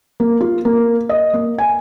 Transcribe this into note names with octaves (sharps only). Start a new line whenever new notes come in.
A#3
F4
A#3
D#5
A#3
G#5